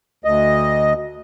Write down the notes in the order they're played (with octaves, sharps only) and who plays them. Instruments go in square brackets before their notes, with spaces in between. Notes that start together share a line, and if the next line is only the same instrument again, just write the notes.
[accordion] D2 D#5